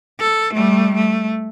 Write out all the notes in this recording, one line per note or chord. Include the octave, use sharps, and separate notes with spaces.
A4
G3 A3
A3